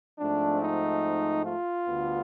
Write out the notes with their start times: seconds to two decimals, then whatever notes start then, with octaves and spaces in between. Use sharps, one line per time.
0.19 G#2 F3 A3 C4 D4
0.61 D#4
1.46 F4
1.88 D2 D3 G3 B3